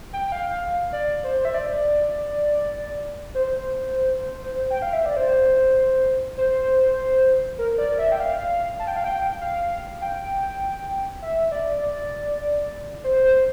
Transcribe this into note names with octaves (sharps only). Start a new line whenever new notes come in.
G5
G5
F5
D5
C5
E5
D5
C5
G5
F5
E5
D5
C5
C5
A#4
D5
E5
G5
F5
A5
G5
F5
G5
F5
G5
E5
D5
D5
C5
C5